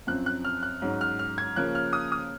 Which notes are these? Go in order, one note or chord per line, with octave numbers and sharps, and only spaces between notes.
F#2 F3 C4 F#6
F#6
F6
F#6
G#2 F#3 C#4
F6
F6
G#6
C#3 F3 A#3 C#4 F#6
F6
D#6
D#6